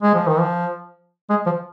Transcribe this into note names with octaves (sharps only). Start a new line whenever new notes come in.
G#3
F3
D#3
F3
G#3
F3